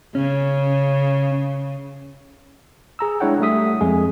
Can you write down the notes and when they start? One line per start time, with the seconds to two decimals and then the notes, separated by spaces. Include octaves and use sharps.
0.15 C#3 C#4
2.99 G#4 A#5 E6
3.20 G#3 D4 E4 C#5 F#5 G5
3.40 G3 A3 G4 E5 D#6 B6
3.81 F2 G#3 G#4